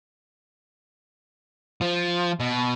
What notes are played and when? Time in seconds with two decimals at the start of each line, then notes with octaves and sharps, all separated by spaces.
1.81 F3
2.40 B2